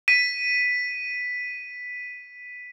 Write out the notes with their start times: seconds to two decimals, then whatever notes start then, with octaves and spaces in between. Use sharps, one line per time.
0.08 B6 D#7